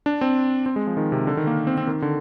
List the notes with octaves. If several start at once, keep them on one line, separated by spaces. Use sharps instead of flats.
D4
C4
C4
G#3
F3
D#3
C3
D3
D#3
A#3
C4
C4
D#3
D3